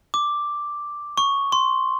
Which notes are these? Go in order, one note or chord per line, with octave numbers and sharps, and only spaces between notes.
D6
C#6
C6